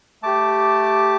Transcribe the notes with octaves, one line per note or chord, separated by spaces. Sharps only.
A3 G4 A5 D6